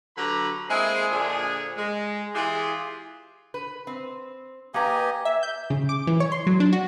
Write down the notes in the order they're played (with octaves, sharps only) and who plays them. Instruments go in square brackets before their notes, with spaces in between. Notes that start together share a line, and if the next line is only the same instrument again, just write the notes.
[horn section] D3 F#3 G4 B4 A#5 B5
G#3 A#3 C4 E4 G#4
A#2 D3 F3 D4 G#4
G#3
E3 F4 G4 G#4
[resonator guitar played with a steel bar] B4
C4
[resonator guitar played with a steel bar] A#3 A#5 [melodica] G4 D#5 G#5 [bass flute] B4
[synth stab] E5
G6
C#3
D6
E3
C#5
C6
F#3
D4
F#4